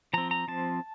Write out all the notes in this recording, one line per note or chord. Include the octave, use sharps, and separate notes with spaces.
F3 C4 A#5
A#5
F3 C4 A5